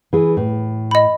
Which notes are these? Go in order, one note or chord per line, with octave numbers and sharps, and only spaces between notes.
E3 G#4
A2
D#5 B5